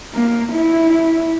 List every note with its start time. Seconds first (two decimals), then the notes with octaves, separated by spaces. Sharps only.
0.13 A#3
0.52 E4